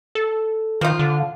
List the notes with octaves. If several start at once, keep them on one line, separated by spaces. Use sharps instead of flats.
A4
D#3 F3 F4
D3